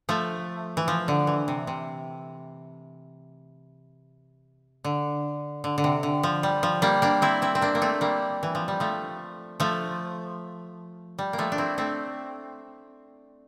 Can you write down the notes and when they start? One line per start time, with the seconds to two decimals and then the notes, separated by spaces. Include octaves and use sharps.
0.09 F3 A3
0.77 E3
0.88 F3
1.08 D3
1.27 E3
1.48 C3
1.67 C3
4.84 D3
5.64 D3
5.78 D3
5.84 C3
6.03 D3
6.23 F3
6.43 G3
6.63 F3
6.82 G3 A#3
7.02 A#3 D4
7.22 C4 E4
7.42 C4 E4
7.55 C4
7.61 A#3 D4
7.75 A#3
7.82 A3 C4
8.01 G3 A#3
8.43 E3
8.55 F3
8.68 G3
8.80 F3 A3
9.60 F3 A3
11.19 G3
11.33 A#3
11.38 F3 A3
11.52 D4
11.58 C4 E4
11.78 A3 C4